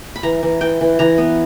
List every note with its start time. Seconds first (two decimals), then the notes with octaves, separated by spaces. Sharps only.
0.16 B5
0.23 E3 A#5
0.43 E3
0.61 E3 G5
0.81 E3
0.99 E3 A#5
1.18 B3